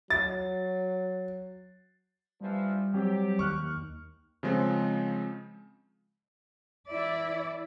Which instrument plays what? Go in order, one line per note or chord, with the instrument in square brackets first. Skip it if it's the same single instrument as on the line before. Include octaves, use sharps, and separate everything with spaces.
[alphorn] F#3 [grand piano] A6
[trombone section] G2 E3 F3 [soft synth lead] G3
[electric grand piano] F#3 C4 [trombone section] G4
[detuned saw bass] D#2 [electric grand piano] C#6 F6 F#6
[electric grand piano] C#3 F3 G#3 C4
[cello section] E3 E4 D5